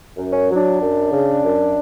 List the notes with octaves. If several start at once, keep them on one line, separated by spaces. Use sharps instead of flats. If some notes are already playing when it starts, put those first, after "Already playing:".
F#2
C#4
F#3
D4
F#2
C#3
F#2